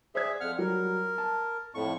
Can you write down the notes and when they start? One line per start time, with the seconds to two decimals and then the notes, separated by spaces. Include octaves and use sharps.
0.15 G#4 C5 D5 E5 G#6
0.40 F2 F#5 F6
0.59 F#3 G3 A#4
1.18 A5
1.75 F2 A2 C#6